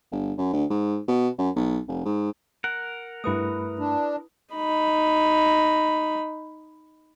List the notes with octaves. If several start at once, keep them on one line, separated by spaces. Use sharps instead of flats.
G1
F#2
D2
G#2
B2
F#2
B1
F1
G#2
A#4 F#5
G2 A3 E4 B4 D#6
D4
D#4 B5